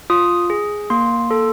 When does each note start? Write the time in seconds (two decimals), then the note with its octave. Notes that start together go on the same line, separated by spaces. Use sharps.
0.10 F4 D#6
0.50 G#4
0.90 A#3 C6
1.31 A4